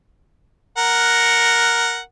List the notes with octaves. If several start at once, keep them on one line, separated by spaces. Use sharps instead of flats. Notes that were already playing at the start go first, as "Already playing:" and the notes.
A#4 F#5